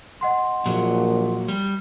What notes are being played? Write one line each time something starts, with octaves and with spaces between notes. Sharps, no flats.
D#5 F#5 C6
A#1 A#2 F#3
G3